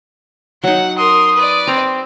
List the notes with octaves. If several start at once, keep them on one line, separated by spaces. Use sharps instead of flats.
F#3 D#4 F#5
A#4 C6 D#6
B4 D5
C4 A#5